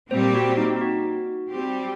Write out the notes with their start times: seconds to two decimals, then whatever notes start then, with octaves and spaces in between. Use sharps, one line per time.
0.11 A#2 G3 C4 G4 C5
0.34 F#4
0.57 D#4
0.76 D#4
0.81 F#4
1.50 G3 C4 G4